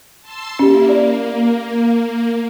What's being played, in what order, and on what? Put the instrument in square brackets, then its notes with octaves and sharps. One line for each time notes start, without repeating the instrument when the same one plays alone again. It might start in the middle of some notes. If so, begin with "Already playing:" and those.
[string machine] A5 C6 E6
[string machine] A#3 E4 [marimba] C#4 G4
[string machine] A#3 [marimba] D5